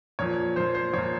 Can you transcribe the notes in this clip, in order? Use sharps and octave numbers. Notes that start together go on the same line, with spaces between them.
A#2 F3 C#5
A#2 F3 C5
C5
A#2 F3 C#5